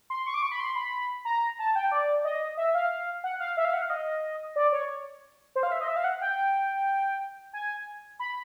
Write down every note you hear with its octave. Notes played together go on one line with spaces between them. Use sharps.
C6
C#6
D6
C#6
B5
C6
B5
A#5
A5
G5
D5
D#5
E5
F5
F#5
F5
E5
F5
F#5
F5
D#5
D5
C#5
C5
F5
E5
D#5
E5
F5
F#5
G5
G#5
B5